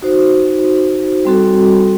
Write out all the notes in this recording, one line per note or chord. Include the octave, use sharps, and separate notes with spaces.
D#4 F#4 C5
G3 C4 F#4 A4